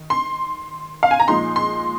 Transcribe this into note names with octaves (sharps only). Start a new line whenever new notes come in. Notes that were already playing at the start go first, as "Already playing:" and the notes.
Already playing: D#3
C6
F5
G#5
A#5
A#2 F3 G#3 D#4 C6
C6